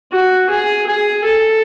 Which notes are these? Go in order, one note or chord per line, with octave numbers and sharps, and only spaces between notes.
F#4
G#4
G#4
A4